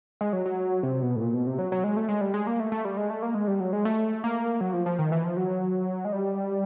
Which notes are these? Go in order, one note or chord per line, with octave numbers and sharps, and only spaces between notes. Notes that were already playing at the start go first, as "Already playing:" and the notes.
G#3
F#3
F#3
C3
B2
A2
A#2
B2
C3
F#3
F#3
G#3
A3
G#3
G3
G#3
A#3
A3
A3
G3
G#3
A3
A#3
G#3
G3
F#3
G#3
A3
A#3
F#3
F3
F3
D#3
E3
F3
F#3
G#3
G3